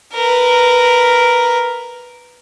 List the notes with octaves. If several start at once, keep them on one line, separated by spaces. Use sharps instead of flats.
A#4 B4